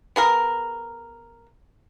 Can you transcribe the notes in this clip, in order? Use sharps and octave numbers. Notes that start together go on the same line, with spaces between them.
B3 G#4 A#4